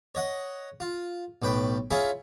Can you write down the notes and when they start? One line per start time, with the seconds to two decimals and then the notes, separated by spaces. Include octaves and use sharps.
0.15 C#5 D#5 F#5
0.80 F4
1.42 B1 A2 B4 G5
1.91 C#4 E4 F4 G#4 E5 G#5